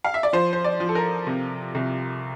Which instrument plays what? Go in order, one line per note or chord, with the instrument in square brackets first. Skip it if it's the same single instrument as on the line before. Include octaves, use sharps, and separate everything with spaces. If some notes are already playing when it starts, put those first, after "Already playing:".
[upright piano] F5
E5
D5
F3 C5
C5
D5
F3
A4
A#4
C3
C2